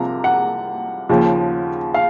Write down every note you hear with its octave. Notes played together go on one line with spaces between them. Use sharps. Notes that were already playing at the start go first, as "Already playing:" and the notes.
Already playing: C2 C3 F3 A#3 A#5
F#5
D#2 C#3 F3
F5